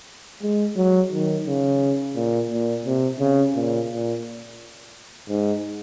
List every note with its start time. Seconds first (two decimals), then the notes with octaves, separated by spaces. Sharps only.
0.42 G#3
0.76 F#3
1.11 D#3
1.47 C#3
2.16 A#2
2.50 A#2
2.85 C3
3.20 C#3
3.55 A#2
3.90 A#2
5.29 G#2